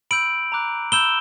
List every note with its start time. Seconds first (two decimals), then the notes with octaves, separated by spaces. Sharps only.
0.11 B5 E6 G6 D7 F#7
0.52 A#5 D6 F#6
0.92 B5 E6 G6 E7 G7